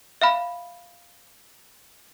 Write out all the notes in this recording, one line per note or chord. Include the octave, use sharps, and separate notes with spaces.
E5 F5 B5